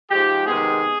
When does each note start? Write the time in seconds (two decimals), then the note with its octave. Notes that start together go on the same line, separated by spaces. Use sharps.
0.11 G#2 F3 G#3 G4
0.47 C3 D#3 G#3 B3 G#4